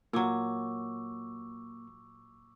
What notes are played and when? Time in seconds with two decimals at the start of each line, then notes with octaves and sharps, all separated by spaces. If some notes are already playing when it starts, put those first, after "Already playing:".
0.13 A#2 F#3 A#3 C#6 D6 E6